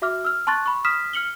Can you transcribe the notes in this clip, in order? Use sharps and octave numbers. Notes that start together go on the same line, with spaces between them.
F#4 E5 D6 F6
E6 F6
A5 C6 C#6 F#6 A6
B5 C#6
D#6 F6 B6 E7
F6 C#7 F#7 G7